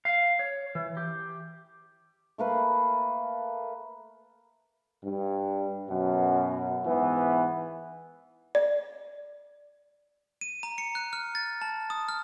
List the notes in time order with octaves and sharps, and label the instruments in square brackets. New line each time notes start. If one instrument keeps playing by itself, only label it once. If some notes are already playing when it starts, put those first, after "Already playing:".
[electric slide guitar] F5
C#5
E3
G4
[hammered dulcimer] A3 A#3 B4
[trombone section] G2
F#2 B2
G#2 E3 B3
[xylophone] D5
[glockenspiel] D#7
A#5
C#7
F#6
F6
A6
A5
D#6
F6